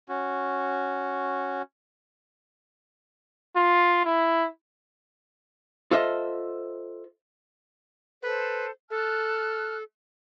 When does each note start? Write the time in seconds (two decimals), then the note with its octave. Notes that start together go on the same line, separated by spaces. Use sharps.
0.09 C#4 F#4
3.56 F4
4.05 E4
5.91 F4 A4 C5 D#5 E5
8.23 A4 B4 C5
8.90 A4 A5 F6 F#6